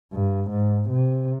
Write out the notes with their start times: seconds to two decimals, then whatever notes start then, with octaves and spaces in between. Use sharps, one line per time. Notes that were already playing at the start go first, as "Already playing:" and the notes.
0.13 G2
0.50 G#2
0.90 C3